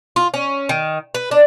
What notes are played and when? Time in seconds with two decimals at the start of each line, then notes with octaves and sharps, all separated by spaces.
0.16 F4
0.34 C#4
0.69 D#3
1.14 B4
1.31 D4